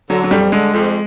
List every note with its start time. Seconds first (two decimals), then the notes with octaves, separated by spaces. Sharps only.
0.10 D3 F#3
0.24 F#3
0.31 F2 G3
0.52 D3 G#3
0.74 F2